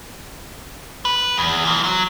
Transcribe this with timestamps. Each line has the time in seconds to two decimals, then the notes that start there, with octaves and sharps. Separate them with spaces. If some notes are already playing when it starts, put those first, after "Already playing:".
1.05 B4
1.38 E2
1.65 E3 F3
1.84 F#3